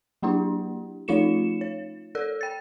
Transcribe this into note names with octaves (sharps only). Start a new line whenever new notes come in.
F#3 A#3 D4 E4 G4
F3 A3 D#4 F4 C#7 E7
C#5
A4 A#4 D5 E6
G5 A6